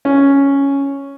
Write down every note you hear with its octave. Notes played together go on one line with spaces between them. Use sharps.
C#4